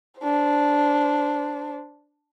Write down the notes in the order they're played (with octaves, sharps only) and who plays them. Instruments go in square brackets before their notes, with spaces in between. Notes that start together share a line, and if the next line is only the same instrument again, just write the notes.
[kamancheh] D4 C5